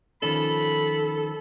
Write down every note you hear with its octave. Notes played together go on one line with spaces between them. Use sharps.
D#3 F3 C#4 A4 B5